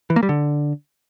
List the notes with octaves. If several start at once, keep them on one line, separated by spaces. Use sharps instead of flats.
E3
A#3
G3
D3